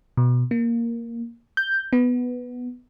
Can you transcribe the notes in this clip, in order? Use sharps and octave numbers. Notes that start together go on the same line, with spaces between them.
B2
A#3
G6
B3